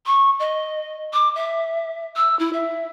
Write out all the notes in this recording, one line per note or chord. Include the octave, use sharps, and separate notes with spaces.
C#6
D#5
D6
E5
E6
E4
E5